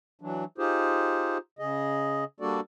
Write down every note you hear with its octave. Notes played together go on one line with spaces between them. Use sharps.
E3 F#3 D4
D#4 F4 G4 G#4 C5
C#3 G#4 D#5
G3 A#3 D4 F#4 A4 D5